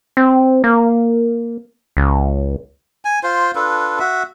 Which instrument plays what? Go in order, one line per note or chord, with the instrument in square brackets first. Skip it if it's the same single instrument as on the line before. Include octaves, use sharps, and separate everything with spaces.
[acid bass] C4
A#3
C#2
[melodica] G#5
F4 C5
D4 F4 A4 B4
F#4 E5